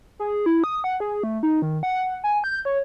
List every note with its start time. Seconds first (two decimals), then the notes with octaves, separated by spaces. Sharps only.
0.19 G#4
0.46 E4
0.64 D#6
0.84 F#5
1.00 G#4
1.23 A3
1.43 D#4
1.62 D#3
1.83 F#5
2.24 G#5
2.44 G6
2.65 C#5